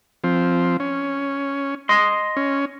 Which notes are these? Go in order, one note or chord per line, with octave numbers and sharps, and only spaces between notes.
F3 C4
C#4
D#5 C6
C#4